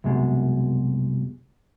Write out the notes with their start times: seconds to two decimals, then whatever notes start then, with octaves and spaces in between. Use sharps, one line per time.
0.04 C2 F#2 B2 G#3